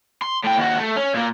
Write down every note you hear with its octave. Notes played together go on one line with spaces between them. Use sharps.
C6
A2 G5
D#2 F#4
A3
C#4
A#2 A#3